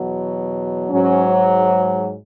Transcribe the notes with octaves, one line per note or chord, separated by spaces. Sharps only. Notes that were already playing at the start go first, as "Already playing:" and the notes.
Already playing: E2 B2 F#3
G#2 F#3 C#4